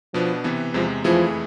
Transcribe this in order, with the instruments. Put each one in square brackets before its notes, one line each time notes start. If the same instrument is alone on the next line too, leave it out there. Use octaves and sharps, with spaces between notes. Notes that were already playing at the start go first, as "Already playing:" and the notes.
[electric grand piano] B2 B3 D4 [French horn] F3
[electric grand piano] C3 E3 B3
[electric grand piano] E2 C3 G#3 [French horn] F3
[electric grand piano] F2 E3 A3 E4 G#4 [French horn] F3